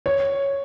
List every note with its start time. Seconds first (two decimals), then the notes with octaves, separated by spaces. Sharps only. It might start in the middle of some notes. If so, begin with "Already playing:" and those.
0.06 C#5